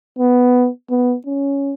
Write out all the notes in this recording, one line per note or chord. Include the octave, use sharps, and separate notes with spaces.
B3
B3
C#4